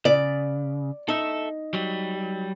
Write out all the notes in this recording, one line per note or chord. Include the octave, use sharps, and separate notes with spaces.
C#3 D5
D#4 A4 E5
F#3 G3